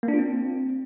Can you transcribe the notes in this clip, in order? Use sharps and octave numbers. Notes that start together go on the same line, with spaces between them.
A#3
D4
F4
C4